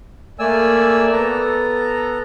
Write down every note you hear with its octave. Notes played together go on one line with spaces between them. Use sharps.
A3 A#3 D5 G#5 E6
B3 A4 A#5